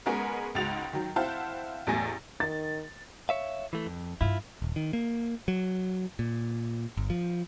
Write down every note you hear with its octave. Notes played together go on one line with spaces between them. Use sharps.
G#3 B3 C#4 G#4 A#4
C#2 G#2 G#3 F#4 A6 F7
D#3 F#3
C4 E4 C5 F5 F#5 A5
A1 E2 A3 G#5 A#6
D#3 A6
C#5 E5 F5
E3 A3
F2
G2 E4 F4
D#1
D#3
A#3
F#3
A#2
G1
F3